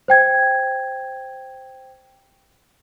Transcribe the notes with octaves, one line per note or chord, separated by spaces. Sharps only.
C5 G5 G#6